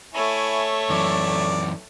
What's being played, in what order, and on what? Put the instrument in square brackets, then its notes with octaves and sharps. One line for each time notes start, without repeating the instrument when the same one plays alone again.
[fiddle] A3 [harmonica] E4 G#5 [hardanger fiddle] C#5 E5
[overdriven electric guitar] F#2 E3 [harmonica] D5